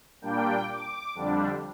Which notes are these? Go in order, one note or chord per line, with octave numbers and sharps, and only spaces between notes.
A#2 G3 A#3 D4 G5
D6
F2 D3 G3 D4